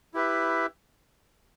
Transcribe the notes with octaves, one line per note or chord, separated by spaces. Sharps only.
E4 G4 B4 E5